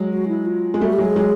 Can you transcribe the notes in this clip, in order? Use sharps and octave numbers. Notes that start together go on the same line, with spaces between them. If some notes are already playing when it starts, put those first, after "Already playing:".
Already playing: F#3 G#3
F#4
E4
F4
G#3
G3 A3 F#4
G4
F#3 G#3
G#4
F#3 G#3